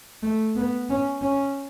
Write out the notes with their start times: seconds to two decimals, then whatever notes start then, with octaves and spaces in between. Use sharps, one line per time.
0.23 A3
0.56 B3
0.89 C#4
1.22 C#4